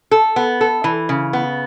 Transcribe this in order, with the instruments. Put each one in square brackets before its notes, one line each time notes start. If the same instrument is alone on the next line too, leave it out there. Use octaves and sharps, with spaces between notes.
[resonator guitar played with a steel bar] A4
B3
A4
E3
C#3
B3